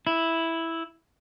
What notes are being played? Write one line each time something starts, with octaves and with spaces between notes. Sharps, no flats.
E4